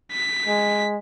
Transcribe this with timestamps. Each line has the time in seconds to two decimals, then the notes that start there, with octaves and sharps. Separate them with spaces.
0.13 B6
0.48 G#3